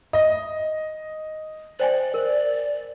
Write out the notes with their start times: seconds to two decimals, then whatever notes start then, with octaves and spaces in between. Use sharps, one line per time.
0.13 D#5 E5
1.80 C5 D5 G5 G#5
2.14 A#4 C5